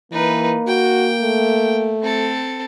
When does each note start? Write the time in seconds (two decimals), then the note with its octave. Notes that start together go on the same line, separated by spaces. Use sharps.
0.12 E3 A#3 D#4 B4
0.68 F#4 G5
1.22 A3
2.03 C4 A4